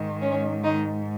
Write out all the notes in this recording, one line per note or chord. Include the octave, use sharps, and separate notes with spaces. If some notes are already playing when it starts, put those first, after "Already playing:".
Already playing: G#2 D#3
C#4
D#3 D#4